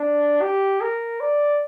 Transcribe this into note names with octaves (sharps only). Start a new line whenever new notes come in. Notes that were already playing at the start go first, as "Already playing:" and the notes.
Already playing: D4
G4
A#4
D5